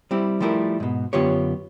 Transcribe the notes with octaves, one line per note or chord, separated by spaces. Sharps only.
G3 C4 E4
F3 G3 A3 E4 A4 A#4
G#2 B2
F#2 D3 B3 F4 G4 C#5